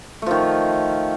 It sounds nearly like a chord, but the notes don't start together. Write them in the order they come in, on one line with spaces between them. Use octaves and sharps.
A3 F3 D#3